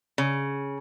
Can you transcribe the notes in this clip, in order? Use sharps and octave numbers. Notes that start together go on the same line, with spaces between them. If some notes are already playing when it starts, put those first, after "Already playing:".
C#3